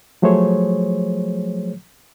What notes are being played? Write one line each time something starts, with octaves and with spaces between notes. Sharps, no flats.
F3 F#3 A3 G#4 C5 C#5